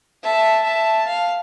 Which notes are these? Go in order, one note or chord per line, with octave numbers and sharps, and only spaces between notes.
E5 A5
E5 A5
F5